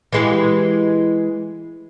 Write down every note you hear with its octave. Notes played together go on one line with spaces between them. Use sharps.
E3 G#3 G4